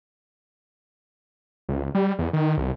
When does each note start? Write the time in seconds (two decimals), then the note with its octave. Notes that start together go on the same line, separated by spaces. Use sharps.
1.69 C#2
1.95 G3
2.19 E2
2.33 D#3
2.57 C2